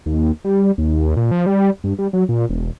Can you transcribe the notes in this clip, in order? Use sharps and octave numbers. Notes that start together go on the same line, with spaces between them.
D#2
G3
D#2
A#2
F3
G3
G2
G3
F#3
A#2
E1